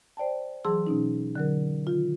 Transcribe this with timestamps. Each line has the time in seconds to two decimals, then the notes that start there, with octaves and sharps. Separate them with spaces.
0.17 C5 D5 G5 A5
0.65 E3 F#3 G#4 A5 C6 E6
0.87 B2 C#4 D#4
1.35 D3 F#3 A#4
1.87 D#3 F4